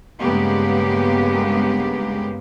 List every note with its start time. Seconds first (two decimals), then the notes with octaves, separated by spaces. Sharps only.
0.19 G2 C#3 G#3 A#3 B3 G4